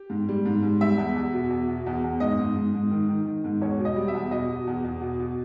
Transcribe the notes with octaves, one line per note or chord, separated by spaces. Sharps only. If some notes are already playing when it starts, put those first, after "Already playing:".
Already playing: G4
G#2
G3
G#2
G#2
G3 E5
E2
E2
B2
E2
B2
E2
E2
G#2 D#5
G#2
G#2
G#2
D#3
D#3
D#3
G#2
E2 C#5
B2
D#5
G3
E5
E2
B2 D#5
B2
E2
E2
B2
B2